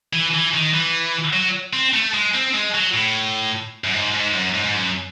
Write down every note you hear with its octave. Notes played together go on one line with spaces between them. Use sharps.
E3
E3
D#3
E3
F#3
C4
A3
G#3
C4
G#3
F#3
A2
F#2
G#2
G#2
F#2
G#2
G#2
F#2